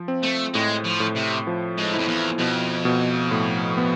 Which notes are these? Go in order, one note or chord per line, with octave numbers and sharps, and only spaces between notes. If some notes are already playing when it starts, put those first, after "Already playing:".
Already playing: F3
C4
A3
A2 G#3
F3
A2
C3
F3
G#2
E4
F2
E2
F2 B2
B2
A2
B3